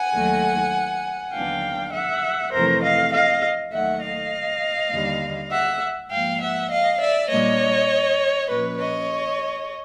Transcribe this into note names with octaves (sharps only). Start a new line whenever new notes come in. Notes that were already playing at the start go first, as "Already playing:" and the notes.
Already playing: F#5 G#5
D#2 D#3 F#3 A3
D#2 D3 F#3 B3 D4 F5 G5
E5 F#5
F2 C3 E3 A3 A#4 C5
D#5 F5
D#5 F5
D#2 D#3 F#3 A3 E5 F#5
D#5 F5
D#2 D3 G3
E5 F#5
G#2 F3 A#3 F5 G5
E5 F#5
D#5 F5
D5 E5
A#2 G3 A#3 D4 C#5 D#5
A#2 F3 A#3 C#4 B4 C#5
C#5 D#5